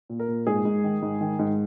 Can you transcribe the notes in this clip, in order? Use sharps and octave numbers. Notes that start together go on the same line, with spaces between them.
A#2
A#4
A#2
G#2 G#4
G#2
D#3
G#2
D#3
G#2